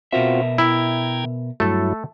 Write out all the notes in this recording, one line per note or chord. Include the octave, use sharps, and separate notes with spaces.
B2 C4 F4 F#4 A#4 E5
E4 G5 A#5 G#6
G2 F#3 A3 E4 A4